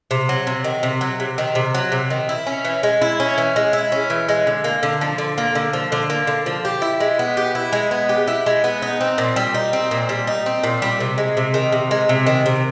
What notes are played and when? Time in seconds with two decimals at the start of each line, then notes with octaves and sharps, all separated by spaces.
0.11 C3
0.29 F#3
0.47 C3
0.64 D#3
0.83 C3
1.01 F#3
1.20 C3
1.38 D#3
1.55 C3
1.75 F#3
1.92 C3
2.10 D#3
2.29 E4
2.46 C#4
2.64 E3
2.83 G#3
3.01 E4
3.20 C#4
3.38 E3
3.56 G#3
3.73 E4
3.92 C#4
4.10 E3
4.29 G#3
4.47 D3
4.64 A#3
4.83 D3
5.01 F3
5.18 D3
5.38 A#3
5.55 D3
5.73 F3
5.92 D3
6.10 A#3
6.27 D3
6.46 F3
6.65 G4
6.82 E4
7.00 G#3
7.19 B3
7.37 G4
7.55 E4
7.73 G#3
7.91 B3
8.09 G4
8.27 E4
8.46 G#3
8.64 B3
8.82 D#4
9.00 C4
9.18 A#2
9.36 G3
9.54 D#4
9.73 C4
9.91 A#2
10.09 G3
10.27 D#4
10.46 C4
10.63 A#2
10.82 G3
11.00 C3
11.18 G#3
11.37 C3
11.54 D#3
11.72 C3
11.91 G#3
12.09 C3
12.26 D#3
12.46 C3